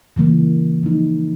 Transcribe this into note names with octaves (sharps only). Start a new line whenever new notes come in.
C#3 E3 G3 A#3
F3 A#3 D#4